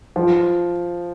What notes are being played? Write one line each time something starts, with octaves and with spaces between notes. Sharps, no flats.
F3